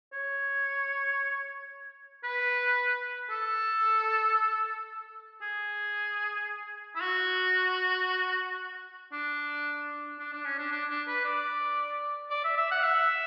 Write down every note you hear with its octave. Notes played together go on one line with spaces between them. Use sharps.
C#5
B4
A4
G#4
E4
F#4
D4
D4
D4
C#4
D4
D4
D4
B4
D5
D5
E5
E5
F#5
E5